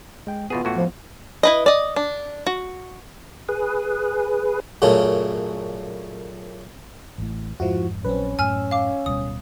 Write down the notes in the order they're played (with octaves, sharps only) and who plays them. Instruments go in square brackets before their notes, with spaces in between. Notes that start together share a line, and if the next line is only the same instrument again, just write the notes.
[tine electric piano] G#3 G5
[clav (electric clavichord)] E2 B2 G#4 [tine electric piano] B3 F4
[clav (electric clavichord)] A2 E3 F#4
[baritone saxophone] F3
[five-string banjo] E4 B4 D#5
D5 D#5
D4
F#4
[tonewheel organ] G#4 B4
[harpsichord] F#2 A#2 C#3 A3 C#4
[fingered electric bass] A1 A2
[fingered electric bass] F2 G#2 [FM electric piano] F3 E4 F#4
[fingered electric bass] A#1 F#3 [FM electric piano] C4 B4 [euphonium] C#4
[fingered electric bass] F#2 A2 [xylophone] G#5 F6 [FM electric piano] E6
[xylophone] F5 D6
[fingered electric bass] D1 B2 G3 [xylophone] D#6